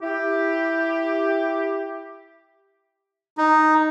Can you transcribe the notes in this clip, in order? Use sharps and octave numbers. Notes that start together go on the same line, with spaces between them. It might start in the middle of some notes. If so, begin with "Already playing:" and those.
E4 G4
D#4